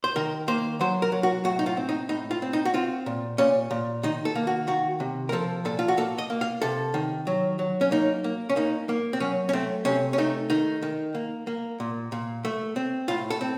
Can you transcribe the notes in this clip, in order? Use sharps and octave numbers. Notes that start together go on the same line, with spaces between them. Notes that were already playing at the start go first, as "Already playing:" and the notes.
C5
D#3 A#4
A#3 C5
F#3 C5
A#4
F#3
F#4
A2 F#4
D#4
F4
C4
D#4
A2 D#4
F4
C4
D#4
F#4
C4 F4
A#2
A#2 C#4
A#2
D#3 D#4
A4
A#3
F#4
D#3 F#4
C3
A#4
F3 A4
A#2 A4
F4
F#4
A#3 A4
D#5
A#3
F5
C3 A4
D#3
F#3
F#3
C#4
A#3 D#4
A#3
C#4
A#3 D#4
A#3
C4
F#3 C#4
C#4
A3 C4
C3 C#4
C#4
A3 D#4
D#3 D#4
D#3
A#3
A#3
A#2
A#2
A3
C4
A2 F4
A4
C4